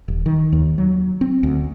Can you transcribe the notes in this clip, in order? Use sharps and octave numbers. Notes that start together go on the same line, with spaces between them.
D#1
D#3
D#2
F#3
C4
D2